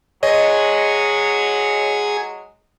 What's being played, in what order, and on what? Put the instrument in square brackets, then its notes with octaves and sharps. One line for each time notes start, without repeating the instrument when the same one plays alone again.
[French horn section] F#3 G#3 [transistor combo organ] G#4 [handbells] C#5 [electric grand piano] D#5